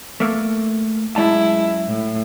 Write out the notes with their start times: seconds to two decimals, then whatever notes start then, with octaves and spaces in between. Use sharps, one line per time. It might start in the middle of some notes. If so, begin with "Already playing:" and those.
0.20 A3 A#3
1.16 F#2 G#3 E4 A5
1.87 A2